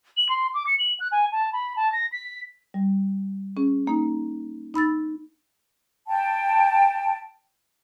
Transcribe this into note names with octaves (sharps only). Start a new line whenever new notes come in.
F#7
C6
D6
C#7
F#7
F#6
G#5
A5
B5
A5
A#6
B6
G3
C#4 G#4
A#3 D#4
D#4 B5 E6 A6
G5 A5